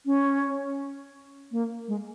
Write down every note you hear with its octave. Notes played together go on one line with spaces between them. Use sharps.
C#4
A#3
G#3